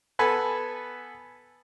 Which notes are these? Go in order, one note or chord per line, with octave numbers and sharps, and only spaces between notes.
B3 A4 B4 G#5